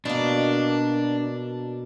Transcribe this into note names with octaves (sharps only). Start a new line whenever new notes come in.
B2 A#3 D4